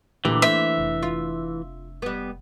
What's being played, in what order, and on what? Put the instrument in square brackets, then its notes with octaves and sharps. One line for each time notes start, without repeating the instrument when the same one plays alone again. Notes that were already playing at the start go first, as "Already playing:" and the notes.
[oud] D2 A#2 G4 [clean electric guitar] E3 [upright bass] A#3
[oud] C5 [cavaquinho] E5
[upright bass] F1
[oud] F4
G3 B3